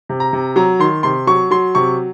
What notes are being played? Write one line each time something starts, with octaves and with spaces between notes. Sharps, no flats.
C3
A#5
C3
F#3 A#5
D#3 C6
C3 C6
F#3 C#6
F#3 C6
C3 C#6